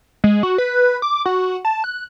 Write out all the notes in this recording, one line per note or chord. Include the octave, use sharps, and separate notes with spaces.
G#3
F#4
B4
D6
F#4
A5
F#6